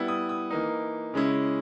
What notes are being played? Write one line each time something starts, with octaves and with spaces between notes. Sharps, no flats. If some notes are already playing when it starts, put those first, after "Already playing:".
Already playing: G3 B3 E4
D#6
D#6
E3 A#3 D#4
C#3 G#3 C#4 E4